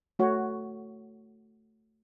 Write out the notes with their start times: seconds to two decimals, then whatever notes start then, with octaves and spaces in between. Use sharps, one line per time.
0.19 A3 F#4 C#5